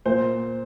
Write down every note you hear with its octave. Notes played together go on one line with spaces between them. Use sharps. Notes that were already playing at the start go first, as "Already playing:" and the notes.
A#2 C5